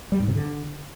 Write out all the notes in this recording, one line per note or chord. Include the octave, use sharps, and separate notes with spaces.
G3
G#2
C3
D3